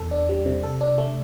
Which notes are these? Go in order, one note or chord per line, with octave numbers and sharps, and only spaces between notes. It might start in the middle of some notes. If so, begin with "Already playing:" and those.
Already playing: E2 A4
D4
G3
C3
A4
D4
A3